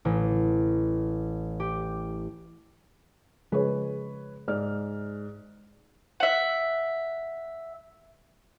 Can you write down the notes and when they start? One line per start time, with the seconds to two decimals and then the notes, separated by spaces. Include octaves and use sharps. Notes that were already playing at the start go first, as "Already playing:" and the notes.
0.05 A1
1.60 G4
3.52 C#3 F3 G#3 B4 C#5
4.48 G#2 D5 F6
6.20 E5 F#5